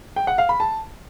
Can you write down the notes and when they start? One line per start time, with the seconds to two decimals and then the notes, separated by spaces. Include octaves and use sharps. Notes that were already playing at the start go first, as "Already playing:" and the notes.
0.16 G5
0.27 F#5
0.38 F5
0.49 B5
0.60 A5